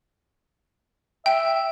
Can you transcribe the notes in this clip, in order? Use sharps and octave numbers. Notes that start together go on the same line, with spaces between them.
E5 G5